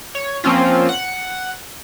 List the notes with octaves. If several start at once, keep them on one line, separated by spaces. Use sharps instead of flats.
C#5
F3 A#3 C4 C#4 F4
F#5